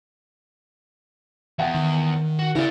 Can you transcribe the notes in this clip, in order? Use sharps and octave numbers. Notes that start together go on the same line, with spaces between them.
E2 E5 F#5 G5
D#3
F#4
C#3 E4 A#4 D5